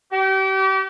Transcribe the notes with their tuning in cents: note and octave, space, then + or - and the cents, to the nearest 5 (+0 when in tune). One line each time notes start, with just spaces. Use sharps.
G4 -35